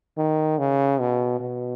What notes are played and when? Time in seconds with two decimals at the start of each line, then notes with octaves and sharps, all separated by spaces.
0.17 D#3
0.59 C#3
1.00 B2
1.40 B2